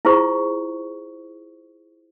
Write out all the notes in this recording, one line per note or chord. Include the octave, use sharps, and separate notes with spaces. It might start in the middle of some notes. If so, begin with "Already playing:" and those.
E4 F4 G#4 C5 C#6